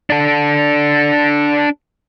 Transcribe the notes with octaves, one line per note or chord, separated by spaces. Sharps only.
D4 A4